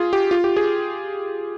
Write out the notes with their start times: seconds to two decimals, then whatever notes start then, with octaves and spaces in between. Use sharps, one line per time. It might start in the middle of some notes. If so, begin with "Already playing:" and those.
Already playing: F4 G#4
0.13 G4
0.31 F4
0.44 G4
0.56 G#4